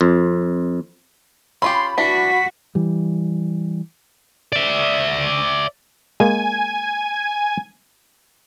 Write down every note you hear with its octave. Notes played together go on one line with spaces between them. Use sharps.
F2
C#4 F4 G4 B5 C6
E3 D4 F#4 B6
E3 G3
D5 E5
G#3 A#3 G#5